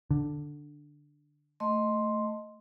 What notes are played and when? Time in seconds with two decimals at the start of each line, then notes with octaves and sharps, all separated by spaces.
0.11 D3
1.60 A3 D#5 C6